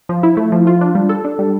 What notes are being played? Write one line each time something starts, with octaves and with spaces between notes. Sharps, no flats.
F3
E4
A3
F3
F4
D4
G3
A4
D4
G3